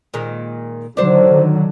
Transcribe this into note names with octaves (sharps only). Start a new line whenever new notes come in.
A#2 D#3 G#3
D3 D#3 F#3 D4 C5